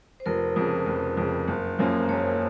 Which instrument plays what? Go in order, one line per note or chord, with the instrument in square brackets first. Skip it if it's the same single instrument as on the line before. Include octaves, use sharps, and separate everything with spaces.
[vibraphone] C5
[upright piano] F1 [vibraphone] A#4
[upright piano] F2 C#3
F1
F2 C#3
F#1
F#2 F3 A#3 C#4
[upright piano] F#1 [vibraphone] C#5